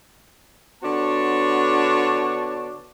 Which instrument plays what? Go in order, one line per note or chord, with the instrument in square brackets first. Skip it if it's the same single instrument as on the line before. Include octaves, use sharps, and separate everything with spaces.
[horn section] D3 B3 D4 F#4 C#5 A5